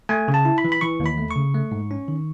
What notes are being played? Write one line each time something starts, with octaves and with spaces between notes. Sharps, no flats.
A3 G#5
C#3
A5
E4
B5
E3
B5
E3 C#6
D#2
B5
A3
C#3 C#6
A3
G#2
C#4
D#3